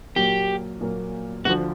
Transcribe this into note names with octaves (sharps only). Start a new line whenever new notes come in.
A#2 F#3 A#3 G4
A#2 F#3 A#3
D2 D3 F3 F#4